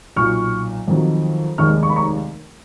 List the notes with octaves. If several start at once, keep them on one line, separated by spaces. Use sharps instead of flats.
B1 A#2 F#3 C#6 F6
F2 D#3 F#3
F1 D#2 D#3 G#3 C#6 F6
C#6
B5
A#5 C#6